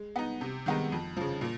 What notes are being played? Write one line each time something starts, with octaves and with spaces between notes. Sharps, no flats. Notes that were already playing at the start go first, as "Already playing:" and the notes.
Already playing: G#3
B3 D#4
C3
D#3 G#3 B3 D#4
F2
C#3 F3
A#2